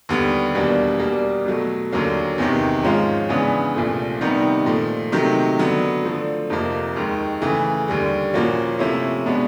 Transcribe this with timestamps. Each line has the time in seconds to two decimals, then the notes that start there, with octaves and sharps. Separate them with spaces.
0.09 D#2 D3 G3 B3
0.55 E2 B2 G3 A#3 D4
1.00 B2 G3 A#3
1.46 B2 F#3 A3
1.92 D#2 D3 F#3 A#3 C#4
2.38 E2 C3 D#3
2.83 G#2 F3 G#3 C#4 F4
3.29 C#3 E3 G#3 B3 D4
3.74 C2 A#2 F3 A3
4.21 C3 D#3 G3 B3 D#4
4.66 A#2 F3 A3
5.12 C3 D#3 F#3 A3
5.59 D3 F#3 B3
6.04 D3 F3 A3
6.50 F2 C3 F3 A#3
6.96 D#2 D#3 G#3
7.42 C#3 E3 A3
7.88 D#2 D3 G3
8.34 A#2 F3 A#3 C#4 F#4
8.79 C3 F3 A3 C#4 E4
9.26 B2 G#3 B3 D4